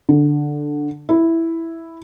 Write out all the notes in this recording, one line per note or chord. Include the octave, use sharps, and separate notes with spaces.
D3
E4